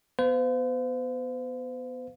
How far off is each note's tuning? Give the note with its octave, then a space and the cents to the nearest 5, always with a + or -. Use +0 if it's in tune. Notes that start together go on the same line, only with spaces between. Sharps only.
B3 +0 C5 -45 F5 +15